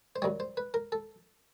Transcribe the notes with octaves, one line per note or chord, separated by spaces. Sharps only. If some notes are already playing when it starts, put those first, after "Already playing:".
C5
F#2 D#3 G3 C#5
C5
B4
A#4
A4